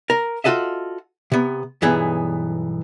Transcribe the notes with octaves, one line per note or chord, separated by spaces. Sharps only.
A#4
F4 F#4 A4 D#5 E5
C3 B3
B1 G2 E3 B3 G#4